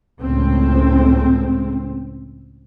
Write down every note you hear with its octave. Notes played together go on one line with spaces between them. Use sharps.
C#2 A2 C4